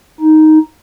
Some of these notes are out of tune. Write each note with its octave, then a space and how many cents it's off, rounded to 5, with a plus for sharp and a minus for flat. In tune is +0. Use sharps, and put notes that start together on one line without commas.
D#4 +5